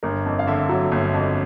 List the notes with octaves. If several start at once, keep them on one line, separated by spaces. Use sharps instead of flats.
G1 A#4
F2
F5
D3 E5
F#3
G1
F2